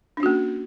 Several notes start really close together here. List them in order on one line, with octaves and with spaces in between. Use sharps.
D4 C#4 F#4 A#3